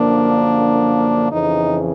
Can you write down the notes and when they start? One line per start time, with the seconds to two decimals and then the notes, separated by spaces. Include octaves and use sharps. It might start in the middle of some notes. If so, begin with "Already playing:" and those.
Already playing: F#2 D3 F3 A#3 D4
1.31 F2 C#3 E3 D#4